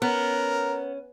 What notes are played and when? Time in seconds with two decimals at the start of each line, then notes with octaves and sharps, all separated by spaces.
0.02 B3 C#4 A#4